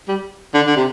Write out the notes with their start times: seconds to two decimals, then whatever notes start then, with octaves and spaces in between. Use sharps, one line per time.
0.08 G3
0.54 D3
0.66 D3
0.77 C3